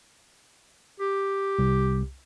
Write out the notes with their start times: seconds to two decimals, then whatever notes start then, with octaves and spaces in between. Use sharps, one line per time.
1.00 G4
1.59 C2